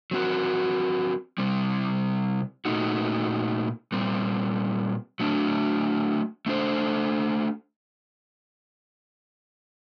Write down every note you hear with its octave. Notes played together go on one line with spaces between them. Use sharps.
F#3 C4 F#4 A#4
C3 G3 C4
A#2 A3 D#4 F#4
A#2 G3 C4
F#3 A3 D4
A3 D4 A4 C5